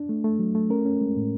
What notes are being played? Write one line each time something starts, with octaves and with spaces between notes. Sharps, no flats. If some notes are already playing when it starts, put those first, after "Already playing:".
Already playing: D4
A3
A3
F#3
A3
C#4 A#4
C#4
G#3
A2